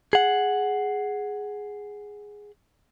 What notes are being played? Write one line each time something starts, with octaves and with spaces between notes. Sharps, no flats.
G#4 F#5